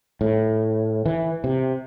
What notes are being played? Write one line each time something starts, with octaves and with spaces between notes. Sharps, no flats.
A2
E3
C3